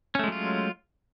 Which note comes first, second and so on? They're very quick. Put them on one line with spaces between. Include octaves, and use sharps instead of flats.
C#4 A3 G#3 F#3 F4